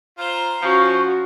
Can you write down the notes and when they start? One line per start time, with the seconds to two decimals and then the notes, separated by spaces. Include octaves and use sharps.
0.18 F4 C5 A#5
0.62 F3 C#4 F#4 C#6